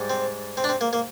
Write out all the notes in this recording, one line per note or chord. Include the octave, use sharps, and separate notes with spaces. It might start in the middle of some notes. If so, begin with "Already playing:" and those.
Already playing: G#2 G3
C4
C4
D4
C4
A#3
A#3